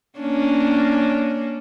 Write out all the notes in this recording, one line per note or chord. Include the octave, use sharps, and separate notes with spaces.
A#3 C#4 D4